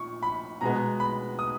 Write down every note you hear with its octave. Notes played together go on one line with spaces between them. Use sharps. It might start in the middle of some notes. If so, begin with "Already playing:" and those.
Already playing: A#2 C#6
B5
B2 G#3 B3 A#5
B5
D#6